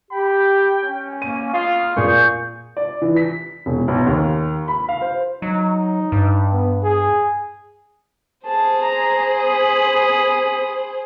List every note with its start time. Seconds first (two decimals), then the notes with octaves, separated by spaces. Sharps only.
0.11 G4 G5 B5
0.82 C#4
1.22 A#3 D#7
1.53 F4 F5 D#6
1.96 A#2 A#3 G#4 C#6 G6
2.77 D5
3.02 E3
3.16 B6
3.66 E1
3.88 B1
4.06 D#2
4.68 B5
4.89 F5
5.01 C5
5.42 F#3 D#4
6.12 G2
6.53 B3
6.83 G#4
8.46 G#4 C5 A5
8.82 A#5
9.43 B5 D#6